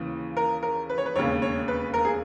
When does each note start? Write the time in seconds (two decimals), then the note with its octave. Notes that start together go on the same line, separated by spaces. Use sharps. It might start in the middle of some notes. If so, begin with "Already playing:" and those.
Already playing: D#2 C#3 E3
0.37 A#4
0.63 A#4
0.90 B4
0.98 C#5
1.06 B4
1.16 E1 D#2 C#3 C#5
1.42 C#5
1.68 B4
1.94 A#4
2.05 G#4